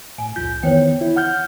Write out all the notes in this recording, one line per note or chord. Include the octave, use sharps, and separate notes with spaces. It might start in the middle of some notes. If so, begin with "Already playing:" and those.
A2 G#5
C2 F2 F4 G6
D#3 E3 B3 C5 C#5 G5
E4
F#5 F6 G6